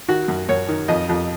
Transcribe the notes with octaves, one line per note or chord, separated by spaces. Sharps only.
D#3 F#4
F#2
F#2 C#5
D#3
F2 D#5
F2